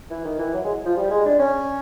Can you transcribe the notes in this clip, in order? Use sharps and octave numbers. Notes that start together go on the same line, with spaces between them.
E3
D#3
E3
F#3
G#3
F3
G3
G#3
D4
C#4